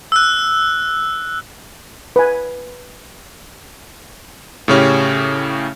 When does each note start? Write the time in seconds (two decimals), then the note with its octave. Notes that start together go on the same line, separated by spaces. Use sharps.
0.12 E6 F#6
2.16 B4 G#5
4.68 A2 C#3 C#4 G4